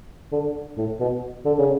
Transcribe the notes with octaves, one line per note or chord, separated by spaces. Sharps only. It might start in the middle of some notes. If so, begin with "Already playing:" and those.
D3
A2
B2
D3
C#3